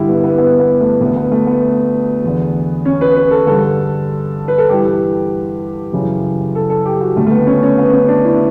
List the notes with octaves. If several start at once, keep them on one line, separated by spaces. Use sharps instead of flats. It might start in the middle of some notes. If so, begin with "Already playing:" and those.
Already playing: G2 D3 E4 G4
B3
B3
B3
B3
A3
D2 D3 B3
B3
A3
B3
E2 D3
C#4
B4
B4
A4
G2 D3 A4
B4
A4
G2 E3 G4
F#2 C#3 E3
A4
A4
G4
F#4
D2 D3 A3
A3
B3
C#4
C#4
B3
C#4
D4
E4